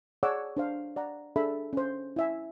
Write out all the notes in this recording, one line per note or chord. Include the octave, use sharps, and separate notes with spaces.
G#4 C#5 D5 F#5 D6 E6
D4 C5 F5
D5 F#5 A#5
D4 G#4 A4 E5 B5
C#4 C5
E4 E5 G#5